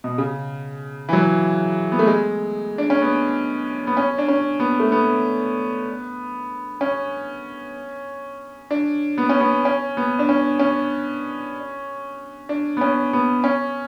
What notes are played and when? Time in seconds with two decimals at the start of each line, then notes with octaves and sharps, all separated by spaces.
0.04 B2
0.18 C#3
1.09 E3
1.13 F#3
1.92 B3
1.99 A3
2.07 G#3
2.78 D4
2.90 C#4
3.02 B3
3.87 B3
3.97 C#4
4.18 D4
4.28 C#4
4.60 B3
4.80 A3
4.92 B3
6.81 C#4
8.71 D4
9.18 B3
9.29 C#4
9.40 B3
9.65 C#4
9.97 B3
10.19 D4
10.29 C#4
10.59 C#4
12.49 D4
12.77 B3
12.81 C#4
13.13 B3
13.44 C#4